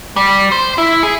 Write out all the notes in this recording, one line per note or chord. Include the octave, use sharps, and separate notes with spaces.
G3
C5
E4
G#4